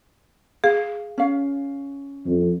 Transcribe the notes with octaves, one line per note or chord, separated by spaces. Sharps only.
G#4 F5
C#4 F5
F2